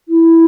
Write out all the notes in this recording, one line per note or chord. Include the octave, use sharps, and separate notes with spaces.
E4